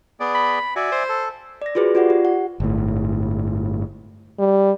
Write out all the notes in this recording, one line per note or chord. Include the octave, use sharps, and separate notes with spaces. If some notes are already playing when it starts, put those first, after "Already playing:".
B3 G#4 D5
B5
F#4 D5 E5 G#5
C5
A4
D5 A#6
F4 F#4 G#4 B4 C5
F4 G4 D5 F#5
G4
F#5
G1 A2
G3